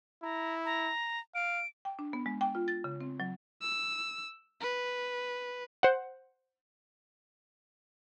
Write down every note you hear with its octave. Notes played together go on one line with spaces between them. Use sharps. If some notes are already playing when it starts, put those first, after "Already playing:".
E4 A#5
A#5
F5 D7
G5
D4
B3
G#3
G5
F4
A6
C#3
C4
F#3
E6
B4
C5 F#5